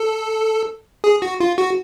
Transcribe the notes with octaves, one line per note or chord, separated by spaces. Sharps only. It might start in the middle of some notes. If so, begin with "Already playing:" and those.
Already playing: A4
G#4
F#4
F4
F#4